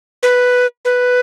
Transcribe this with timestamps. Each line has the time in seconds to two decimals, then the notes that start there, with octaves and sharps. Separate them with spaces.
0.23 B4
0.85 B4